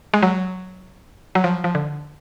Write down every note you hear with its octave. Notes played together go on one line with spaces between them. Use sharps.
G#3
F#3
F#3
F3
F3
D3